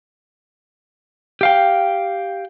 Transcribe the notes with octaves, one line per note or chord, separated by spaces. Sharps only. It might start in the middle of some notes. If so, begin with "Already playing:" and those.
G4 F5 G5